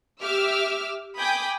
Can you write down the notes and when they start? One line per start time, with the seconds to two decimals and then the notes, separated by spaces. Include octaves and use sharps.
0.22 G4 E5 D6 E6 F6
1.18 G5 G#5 B5 D6 D#6 G6